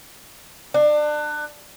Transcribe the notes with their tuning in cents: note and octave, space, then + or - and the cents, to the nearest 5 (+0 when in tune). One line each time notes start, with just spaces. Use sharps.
D4 +30